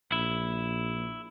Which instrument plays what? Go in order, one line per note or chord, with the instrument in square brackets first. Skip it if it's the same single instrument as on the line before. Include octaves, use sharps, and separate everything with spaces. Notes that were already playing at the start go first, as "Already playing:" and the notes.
[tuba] A#1 [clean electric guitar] E4